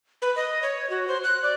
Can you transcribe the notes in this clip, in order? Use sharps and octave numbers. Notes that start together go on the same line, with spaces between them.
B4
D#5
C#5
F#4
C5
F#6
D5